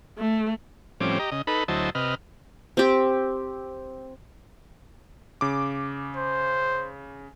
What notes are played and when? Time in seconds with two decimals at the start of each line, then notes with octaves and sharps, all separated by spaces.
0.18 A3
1.01 A2 F3 G3 C4 C#4 D6
1.19 G4 D#5 A#5
1.32 C#3 D#5
1.47 D#4 A4 B4 B5
1.68 D2 F#3 E4 C5 D#5 A5
1.95 C3 B4 D#5 F6
2.77 C4 G4
5.41 C#3 D6
6.17 C5